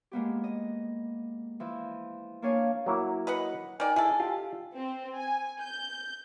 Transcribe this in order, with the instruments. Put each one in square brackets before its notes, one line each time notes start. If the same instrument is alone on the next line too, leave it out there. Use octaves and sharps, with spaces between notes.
[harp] G#3 A#3 B3 G4
D#5
E3 F3
A#3 D4 C#5 F5 G#5
[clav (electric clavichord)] F#3 A#3 E4
[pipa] B4 D#5 F#5
[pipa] D#3 D5 [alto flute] G#5
[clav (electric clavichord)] E4 [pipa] G#4 A4
[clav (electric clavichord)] F4 G4
[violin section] C4
G#5
G6